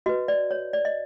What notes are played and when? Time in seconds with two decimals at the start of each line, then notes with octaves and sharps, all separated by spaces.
0.06 F#4 B4 D#5
0.28 D5
0.51 C#5
0.73 D5
0.85 D#5